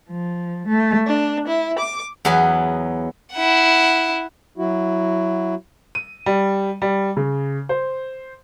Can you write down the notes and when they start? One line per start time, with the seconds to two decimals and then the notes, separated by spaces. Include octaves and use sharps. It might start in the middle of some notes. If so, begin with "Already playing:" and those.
0.10 F3
0.67 A3
1.07 D4
1.47 E4
1.78 D6
2.25 E2 F#3 B3 G#5 B5
3.33 E4 F#5
4.58 F#3 E4 F#4
5.95 D#7
6.26 G3
6.82 G3
7.17 C#3
7.69 C5